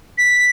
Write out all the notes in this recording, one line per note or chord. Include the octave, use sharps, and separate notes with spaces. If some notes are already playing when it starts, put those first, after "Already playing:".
B6